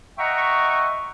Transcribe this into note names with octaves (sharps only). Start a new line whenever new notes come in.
D#5 E5 F#5 G5 A#5 C#6